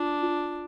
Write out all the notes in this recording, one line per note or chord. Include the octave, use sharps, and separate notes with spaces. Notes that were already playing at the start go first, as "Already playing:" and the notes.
Already playing: D4 F4
F4